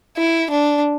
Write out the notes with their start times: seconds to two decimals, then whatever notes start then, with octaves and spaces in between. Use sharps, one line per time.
0.17 E4
0.51 D4